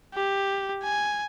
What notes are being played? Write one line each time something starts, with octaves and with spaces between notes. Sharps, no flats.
G4
G#5